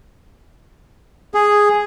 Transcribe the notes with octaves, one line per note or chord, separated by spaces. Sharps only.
G#4